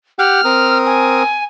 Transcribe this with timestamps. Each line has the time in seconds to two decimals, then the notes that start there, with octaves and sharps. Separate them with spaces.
0.19 G4 F#5 G5 F6
0.45 C4 A#4 D#6
0.86 G#5